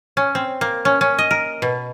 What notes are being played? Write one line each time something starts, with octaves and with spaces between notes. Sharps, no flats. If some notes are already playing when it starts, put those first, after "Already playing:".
C#4
C4
A#3
C#4
C#4
D#5
A#4
B2